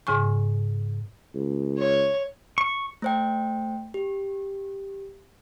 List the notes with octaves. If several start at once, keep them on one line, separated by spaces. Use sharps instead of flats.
G#2 C#3 G#5 C#6
C#2
C#5
C#6
A3 C5 G5
G4